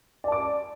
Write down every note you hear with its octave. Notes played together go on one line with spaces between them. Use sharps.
D5 A5 D6